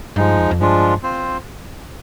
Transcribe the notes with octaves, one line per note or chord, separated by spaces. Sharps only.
G2 F3 G#3 D#4
F2
F2
G2 F3 G#3 D4 F4
C4 F4 C5